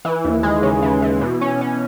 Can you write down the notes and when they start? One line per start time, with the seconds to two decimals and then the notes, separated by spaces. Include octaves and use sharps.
0.05 E3
0.24 D#2
0.43 G#3
0.63 C#3
0.83 E3
1.02 E3
1.21 B2
1.41 C#4
1.61 C#4